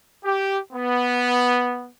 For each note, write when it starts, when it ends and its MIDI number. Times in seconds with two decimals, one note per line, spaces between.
0.24 0.58 67
0.72 1.89 59